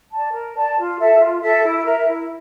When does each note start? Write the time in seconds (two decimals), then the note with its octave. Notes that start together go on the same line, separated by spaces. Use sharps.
0.12 D5 A5
0.33 A#4
0.55 D5 A5
0.77 F4
0.98 A4 E5
1.20 F4
1.42 A4 E5
1.63 E4
1.85 A#4 E5
2.07 E4